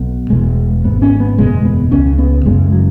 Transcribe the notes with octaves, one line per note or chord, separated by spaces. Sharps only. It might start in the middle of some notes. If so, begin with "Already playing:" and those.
Already playing: B1 B2
E1 E2 B2 G#3
G#1 G#2 B3
C#4
B3
F#1 E2 B2 G#3
B3
C#2 C#3 C#4
B3
F#1 F#2 C#3 G#3
F#3